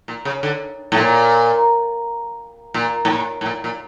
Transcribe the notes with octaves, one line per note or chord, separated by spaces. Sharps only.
A#2
C#3
D3
A2
A#2
A#2
A2
A#2
A2
A#2
A#2